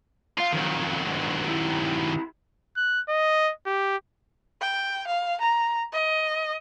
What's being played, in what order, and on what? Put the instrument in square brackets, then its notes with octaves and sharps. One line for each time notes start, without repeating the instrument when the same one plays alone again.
[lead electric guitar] C#2 F5 [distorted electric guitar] F4
[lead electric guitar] F#2 F3 [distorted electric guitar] D#3 F#3
[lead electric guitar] G#2 D3
E4 G4
[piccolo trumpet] F#6
D#5
G4
[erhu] G5
F5
A#5
D#5